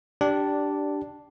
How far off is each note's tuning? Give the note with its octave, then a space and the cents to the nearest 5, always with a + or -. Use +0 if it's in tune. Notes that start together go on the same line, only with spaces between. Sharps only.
D4 +0 G4 -10 D5 -10